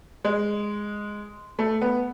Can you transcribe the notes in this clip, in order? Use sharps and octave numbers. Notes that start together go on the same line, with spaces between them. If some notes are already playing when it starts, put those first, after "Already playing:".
G#3
A3
B3